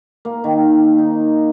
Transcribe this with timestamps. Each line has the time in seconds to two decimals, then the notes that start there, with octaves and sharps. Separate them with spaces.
0.25 A#3
0.44 D#3
0.98 D#4